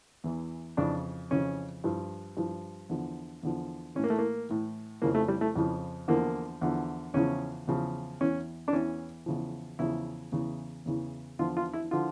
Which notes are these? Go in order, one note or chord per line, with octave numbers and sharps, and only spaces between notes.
E2 E3
F2 C#3 E3 D4
F2 C#3 E3 C#4
G2 F3
G2 F3
E2 D3 F3
E2 D3 F3
A2 E3 C#4
A#3
A3
A#3
A2 E3
F2 C#3 F3 A#3
A3
G3
A3
F2 C#3 F3
E2 D3 F3 A#3
E2 D3 F3
E2 C#3 F3 C#4
E2 C#3 F3
E2 E3 C#4
D4
E2 E3 C#4
E2 C#3 F3
E2 C#3 F3 E4
E2 C#3 E3
E2 C#3 E3
E2 D3 F3 F4
F4
E4
D3 F3 F4